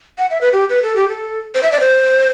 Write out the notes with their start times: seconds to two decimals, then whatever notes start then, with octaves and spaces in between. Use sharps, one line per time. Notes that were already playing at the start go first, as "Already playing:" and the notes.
0.18 F#5
0.30 E5
0.41 B4
0.53 G4
0.69 B4
0.83 A4
0.96 G4
1.08 A4
1.55 C5
1.63 E5
1.72 D5
1.80 C5